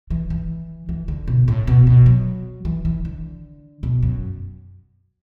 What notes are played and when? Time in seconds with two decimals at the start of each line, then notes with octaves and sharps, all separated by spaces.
0.10 E3
0.30 E3
0.89 E3
1.08 D3
1.28 B2
1.48 A2
1.67 B2
1.87 B2
2.06 F#3
2.65 E3
2.85 E3
3.05 D3
3.83 B2
4.02 F#2